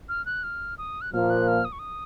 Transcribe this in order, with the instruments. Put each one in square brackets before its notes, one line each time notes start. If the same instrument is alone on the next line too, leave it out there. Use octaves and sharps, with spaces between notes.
[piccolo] F6
F#6
F6
D#6
F#6
[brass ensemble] A#2 F3 A#3 [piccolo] F6
[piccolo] F#6
F6
D#6
C#6
D#6